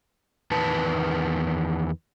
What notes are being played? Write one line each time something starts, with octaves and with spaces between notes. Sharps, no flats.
E2 D#3 B4 A5